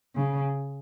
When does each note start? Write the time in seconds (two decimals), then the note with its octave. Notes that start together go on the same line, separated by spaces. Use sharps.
0.15 C#3